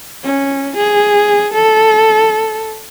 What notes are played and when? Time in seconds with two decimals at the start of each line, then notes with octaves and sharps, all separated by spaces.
0.24 C#4
0.77 G#4
1.53 A4